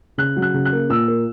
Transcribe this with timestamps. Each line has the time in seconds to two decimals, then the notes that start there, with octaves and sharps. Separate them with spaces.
0.18 C#3 F#6
0.36 F#3
0.42 F#6
0.54 C#3
0.65 F#6
0.73 A#3
0.89 A#2 E6
1.08 A#3